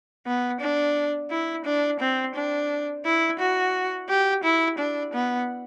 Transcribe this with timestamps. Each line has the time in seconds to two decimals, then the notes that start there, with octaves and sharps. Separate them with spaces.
0.27 B3
0.61 D4
1.31 E4
1.65 D4
2.00 C4
2.35 D4
3.05 E4
3.39 F#4
4.09 G4
4.44 E4
4.79 D4
5.14 B3